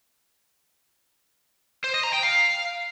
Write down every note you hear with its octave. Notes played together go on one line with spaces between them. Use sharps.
C5
D#5
A#5
G5
F5